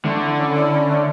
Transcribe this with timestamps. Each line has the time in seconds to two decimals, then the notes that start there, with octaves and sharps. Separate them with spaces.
0.05 D3 A3
0.22 E4
0.38 C#4
0.55 E4
0.72 C#4
0.89 A3